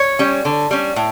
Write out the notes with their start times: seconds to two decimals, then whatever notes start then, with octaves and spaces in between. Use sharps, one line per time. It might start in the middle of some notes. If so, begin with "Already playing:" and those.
Already playing: C#5
0.19 G3 C#4
0.45 D3
0.71 G3 C#4
0.96 A2